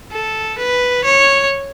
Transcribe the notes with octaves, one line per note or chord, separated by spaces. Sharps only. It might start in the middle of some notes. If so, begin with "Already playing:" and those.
A4
B4
C#5